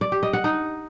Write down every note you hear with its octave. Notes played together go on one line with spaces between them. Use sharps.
D5
G4
D#5
F#5
D#4